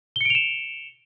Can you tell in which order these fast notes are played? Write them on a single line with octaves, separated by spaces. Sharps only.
G7 C#7 D7 F7 E7